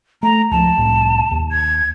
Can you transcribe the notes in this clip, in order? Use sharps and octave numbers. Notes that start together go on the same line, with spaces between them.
A3 A#5
C#2 F3 A5
C2 A2
D#2
G#6